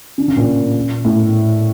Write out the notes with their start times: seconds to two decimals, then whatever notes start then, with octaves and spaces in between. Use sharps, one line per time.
0.18 D3
0.28 C#3
0.37 A#2
1.05 A2